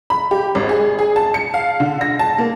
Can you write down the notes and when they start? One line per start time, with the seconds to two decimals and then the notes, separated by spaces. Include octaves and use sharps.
0.10 B5
0.31 G4
0.55 G#1
0.69 G#4
0.99 G#4
1.16 A5
1.34 C#7
1.54 F5
1.80 D3
2.01 A#6
2.19 A5
2.38 A#3